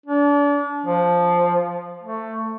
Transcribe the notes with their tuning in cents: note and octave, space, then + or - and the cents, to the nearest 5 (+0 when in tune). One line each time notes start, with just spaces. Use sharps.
D4 -35
F3 +0
A3 +15